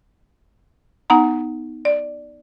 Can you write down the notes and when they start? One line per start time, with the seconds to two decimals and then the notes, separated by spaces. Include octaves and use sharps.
1.10 B3 D#4 F#5 G#5 A#5
1.85 D5